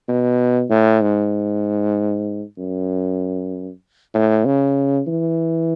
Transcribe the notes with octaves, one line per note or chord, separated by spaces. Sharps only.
B2
A2
G#2
F#2
A2
C#3
E3